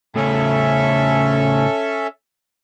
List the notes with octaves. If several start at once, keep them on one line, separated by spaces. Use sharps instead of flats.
A2 C#3 C#4 A4 E5